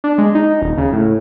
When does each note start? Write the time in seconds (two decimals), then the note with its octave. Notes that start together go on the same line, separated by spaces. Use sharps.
0.04 D4
0.18 G#3
0.35 D#4
0.62 D#1
0.78 C#3
0.93 A2